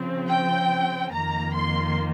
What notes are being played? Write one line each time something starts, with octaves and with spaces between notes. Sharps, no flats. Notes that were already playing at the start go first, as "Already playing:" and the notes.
Already playing: C#3 F3 C4
G5
F2 D#3 A#3 A#5
C6